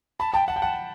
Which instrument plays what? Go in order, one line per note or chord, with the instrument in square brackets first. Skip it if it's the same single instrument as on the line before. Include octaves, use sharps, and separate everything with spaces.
[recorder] A5 [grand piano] B5
[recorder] G5 [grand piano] A5
[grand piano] F#5 [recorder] A5
[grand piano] G5
F#5